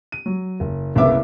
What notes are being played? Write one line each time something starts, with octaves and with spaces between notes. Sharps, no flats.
D#7
F#3
F#1
F#1 C2 C#3 B3 E5 D6